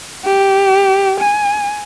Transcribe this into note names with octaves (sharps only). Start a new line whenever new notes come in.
G4
G#5